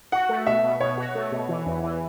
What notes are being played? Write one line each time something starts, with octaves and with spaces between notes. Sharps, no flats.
F#4 F#5
A3
B2 E5
B2
B2 C#5
F#4
A3
B2
E3
E2
E3